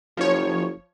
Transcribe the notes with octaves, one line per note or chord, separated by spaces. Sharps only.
F#1 F3 C#5